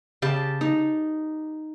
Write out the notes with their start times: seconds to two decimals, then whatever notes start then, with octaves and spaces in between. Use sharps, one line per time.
0.22 C#3 G4 A5
0.61 D#4